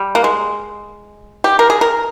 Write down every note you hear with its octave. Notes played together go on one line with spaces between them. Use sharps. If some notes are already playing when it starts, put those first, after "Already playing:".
Already playing: G3
A#3
G#3
G4
A#4
G#4
A#4